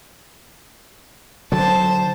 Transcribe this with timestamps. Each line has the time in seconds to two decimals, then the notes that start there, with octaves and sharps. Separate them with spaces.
1.52 D3 F#3 C5 A5